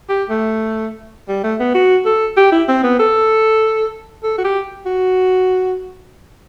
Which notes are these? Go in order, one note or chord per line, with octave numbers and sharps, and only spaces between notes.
G4
A3
G3
A3
B3
F#4
A4
G4
E4
C4
B3
A4
A4
F#4
G4
F#4